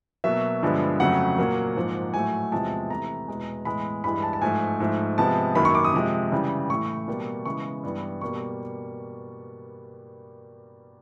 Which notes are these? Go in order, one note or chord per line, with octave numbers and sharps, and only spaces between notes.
B2 F#3 A#3 E5
G2 D3 F3 G#3 B3
F2 C#3 F#3 A3 F#5
A#2 F#3 A#3
G#2 F3 A#3
A2 F#3 A3 G#5
E2 C3 F3 G#3 A5
C3 E3 A3 A#5
E2 B2 G#3
A2 E3 G#3 B3 B5
G2 E3 G#3 B5
A5
A5
G#2 F3 A3 G#5
G#2 F3 A3
C3 F3 G#3 B3 A5
F#2 D#3 F#3 A#3 B5
C#6
D6
D#6
C3 F3 G#3
C#3 E3 G3
A2 E3 A3 C#6
B2 G3 A#3
C#3 E3 G#3 B3 C#6
G2 E3 G3 B3
B2 G3 A#3 C#6